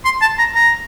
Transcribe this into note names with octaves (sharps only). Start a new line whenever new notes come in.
C6
A5
A#5
A#5